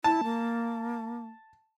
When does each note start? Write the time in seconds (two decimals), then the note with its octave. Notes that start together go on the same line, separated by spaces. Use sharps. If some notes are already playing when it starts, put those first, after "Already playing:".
0.04 E4 A5
0.24 A#3